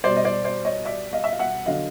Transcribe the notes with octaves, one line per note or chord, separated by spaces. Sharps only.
B2 G3 C5 D5
D#5
C5 D5
C5 D5
C#5 D#5
D5 E5
D#5 F5
E5
F5
E5 F#5
D3 F#3 D#5 F5